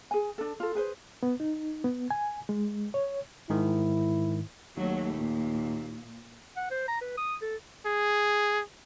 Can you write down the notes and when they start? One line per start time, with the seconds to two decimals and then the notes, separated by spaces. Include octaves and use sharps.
0.11 G#4 G#5
0.38 D4 A4
0.60 F4 A4
0.75 G#4 B4 C5
1.23 B3
1.40 D#4
1.84 B3
2.11 G#5
2.49 G#3
2.94 C#5
3.50 G#2 D#3 E4
4.77 D#2 F#3 A3
5.14 A#2
6.57 F#5
6.71 C5
6.88 A#5
7.01 B4
7.17 D#6
7.42 A4
7.86 G#4